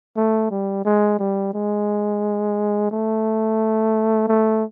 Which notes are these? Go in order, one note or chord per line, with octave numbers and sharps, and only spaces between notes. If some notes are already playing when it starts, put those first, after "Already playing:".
A3
G3
G#3
G3
G#3
A3
A3